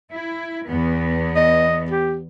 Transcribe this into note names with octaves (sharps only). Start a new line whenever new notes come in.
E4
E2 B3
D#5
G4